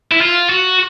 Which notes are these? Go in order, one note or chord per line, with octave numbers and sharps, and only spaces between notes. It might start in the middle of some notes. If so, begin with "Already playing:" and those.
E4
F4
F#4